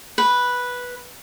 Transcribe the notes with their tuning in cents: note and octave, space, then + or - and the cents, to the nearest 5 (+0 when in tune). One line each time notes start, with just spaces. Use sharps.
B4 -5